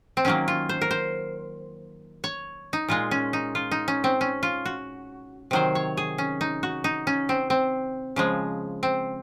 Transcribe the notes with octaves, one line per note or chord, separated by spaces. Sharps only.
C4
D#3 F#3 A#3 C#4
F4
C5
A#4
C5
C#5
D#4
A#2 G#3 F4
C#4
D#4
F4
D#4
C#4
C4
C#4
F4
F#4
C3 D#3 F#3 C5
C#5
G#4
C#4
D#4
F#4
D#4
C#4
C4
C4
C#3 F3 G#3
C4